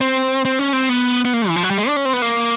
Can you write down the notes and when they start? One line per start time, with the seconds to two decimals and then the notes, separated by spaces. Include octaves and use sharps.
0.01 C4
0.45 C4
0.59 C#4
0.73 C4
0.89 B3
1.25 B3
1.34 A#3
1.48 E3
1.56 F3
1.63 F#3
1.71 G3
1.78 G#3
1.88 D4
1.96 C#4
2.05 C4
2.13 B3
2.22 A#3